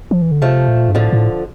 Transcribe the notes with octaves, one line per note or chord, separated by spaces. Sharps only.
F3
E3
D3
C3 F3 A3
A#2
G2
A2 D3 F3
A2